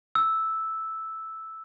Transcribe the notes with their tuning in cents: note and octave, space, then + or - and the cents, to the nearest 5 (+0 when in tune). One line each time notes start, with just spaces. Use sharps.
E6 -5